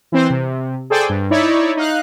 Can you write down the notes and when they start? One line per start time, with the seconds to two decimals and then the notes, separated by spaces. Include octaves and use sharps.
0.12 E3 C4 C5
0.30 C3
0.90 G#4 A4 C5 D5 G5 G#5
1.09 G2
1.30 D#4 E4 C#5 D5 E5
1.77 D#4 F5 F#6